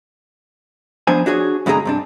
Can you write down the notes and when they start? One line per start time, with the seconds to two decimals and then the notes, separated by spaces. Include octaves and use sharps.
1.07 F3 B3 D4 C5 G#5
1.26 D4 F#4 G#4 C#5
1.66 G2 B2 D3 G#3 G#4 A#5
1.85 G2 C3 D4